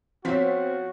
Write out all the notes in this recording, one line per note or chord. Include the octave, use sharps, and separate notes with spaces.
F3 B3 C4 F#4 A#4 C#5 F5 B6